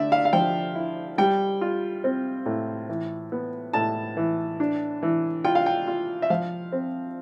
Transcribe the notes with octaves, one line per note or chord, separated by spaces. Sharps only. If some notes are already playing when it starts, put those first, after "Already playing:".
Already playing: D3 A3 D5 E5
F5
F5
F3 G5
E4
G3 G5
F4
C4
A2
E3
B3
A2 A5
E3
D4
E3
F4 G5
F5
G5
F4
E5
F3 F5
C4